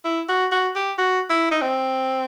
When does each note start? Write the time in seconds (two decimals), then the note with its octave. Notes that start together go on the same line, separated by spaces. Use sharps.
0.05 E4
0.29 F#4
0.52 F#4
0.75 G4
0.98 F#4
1.29 E4
1.51 D#4
1.61 C4